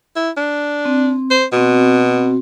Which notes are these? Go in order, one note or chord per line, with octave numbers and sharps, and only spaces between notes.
E4
D4
C4
C5
B2 C4 F#4